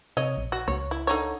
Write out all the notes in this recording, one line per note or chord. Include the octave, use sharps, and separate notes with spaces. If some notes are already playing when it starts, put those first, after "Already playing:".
C3 C#5 D#5
A#1
F#4
C#2 C#5
E4
D3 D#4 C#5